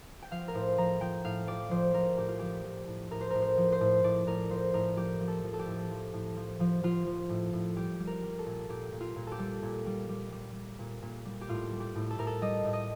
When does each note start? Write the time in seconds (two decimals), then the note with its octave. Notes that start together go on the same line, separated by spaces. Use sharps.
0.22 G5
0.31 F3 F5
0.48 A#4
0.54 A2 C5
0.78 F3 A#5
1.01 F3 G5
1.25 A2 F5
1.47 F3 D5
1.71 F3 C5
1.94 F3 A#4
2.17 A2 G4
2.29 F4
2.39 F3 G4
2.65 F3
2.87 A2
3.11 A2 A#4
3.21 C5
3.30 A2 A#4
3.42 C5
3.58 F3
3.72 C5
3.81 A2
4.04 A2 D5
4.27 A2 A#4
4.50 F3 C5
4.74 A2 A#4
4.97 F3 G4
5.20 F3
5.28 A4
5.43 F3
5.54 A4
5.59 G4
5.67 A2
5.90 F3
6.13 A2
6.37 F3
6.60 F3
6.83 F3 F4
7.07 F3
7.30 A2
7.53 A2
7.76 G3 G4
8.00 G3
8.07 A#4
8.23 G3
8.39 A4
8.46 A#2
8.69 A#2 G4
8.93 A#2
9.01 F4
9.16 A#2
9.27 G4 A4
9.39 G3
9.62 A#2
9.86 G3
10.09 G3
10.32 G3
10.55 G3
10.79 A#2
11.02 A#2
11.25 G3
11.41 G4
11.49 A2 F4
11.72 G3
11.80 G4
11.96 A2
12.10 A4
12.18 A2 A#4
12.27 A4
12.41 G3 D#5
12.65 A2
12.73 D#5